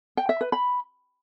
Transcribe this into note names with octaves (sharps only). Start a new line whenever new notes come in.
G5
E5
B4
B5